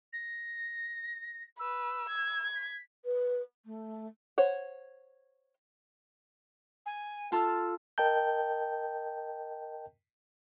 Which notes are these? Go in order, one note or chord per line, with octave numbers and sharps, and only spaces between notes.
A#6
B4 E6
G#6
B6
B4
A3
C5 C#5 F#5
G#5
F4 A4 A5 F6
A#4 D#5 G5 A5 G6